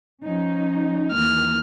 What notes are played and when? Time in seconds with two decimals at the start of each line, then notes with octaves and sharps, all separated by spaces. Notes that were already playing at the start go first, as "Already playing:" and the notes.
0.24 F3 C#4 D#4
1.13 D#2 E3 A#3 F6